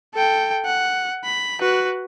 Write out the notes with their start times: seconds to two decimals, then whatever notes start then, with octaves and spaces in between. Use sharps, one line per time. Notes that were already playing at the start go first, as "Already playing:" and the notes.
0.14 A4 G5
0.65 F#5
1.25 B5
1.60 F#4 B4